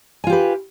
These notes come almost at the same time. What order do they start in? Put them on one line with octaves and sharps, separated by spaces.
G#5 F4 G4 B4